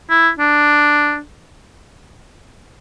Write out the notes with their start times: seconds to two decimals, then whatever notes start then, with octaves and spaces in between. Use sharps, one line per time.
0.10 E4
0.39 D4